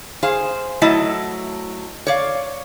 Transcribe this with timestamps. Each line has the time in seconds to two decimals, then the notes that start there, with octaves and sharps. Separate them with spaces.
0.23 G#4 C5 F5
0.82 F#3 A3 E4 D#5 A5
2.07 C#5 D5 F5